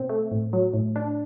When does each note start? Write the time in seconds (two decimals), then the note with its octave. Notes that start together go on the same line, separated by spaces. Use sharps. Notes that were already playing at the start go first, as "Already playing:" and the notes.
Already playing: B2 C4
0.09 A3
0.31 A2
0.53 F#3
0.74 A2
0.96 D4